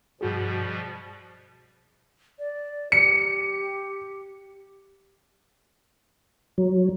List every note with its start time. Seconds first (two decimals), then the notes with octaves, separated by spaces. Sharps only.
0.21 G2 B2 F3 G3 F#4 G#4
2.39 D5
2.92 G4 C#7
6.58 F#3